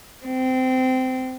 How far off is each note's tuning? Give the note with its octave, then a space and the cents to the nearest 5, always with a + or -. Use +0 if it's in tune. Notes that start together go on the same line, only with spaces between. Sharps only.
C4 -20